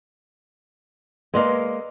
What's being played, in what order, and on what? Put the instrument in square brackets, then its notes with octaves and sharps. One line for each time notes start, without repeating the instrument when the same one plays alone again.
[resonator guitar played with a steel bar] G#3 A#3 [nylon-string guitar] B4 D5 D#5